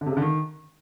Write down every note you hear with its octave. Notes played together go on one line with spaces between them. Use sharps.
D3
C3
C#3
D3
D#3